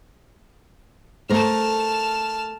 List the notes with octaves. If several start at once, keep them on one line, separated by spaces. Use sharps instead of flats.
A3 A#4 C5 A5 F6